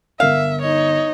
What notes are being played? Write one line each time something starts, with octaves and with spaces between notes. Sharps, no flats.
G1 A#4 E5 F5
D#4 C#5 D#5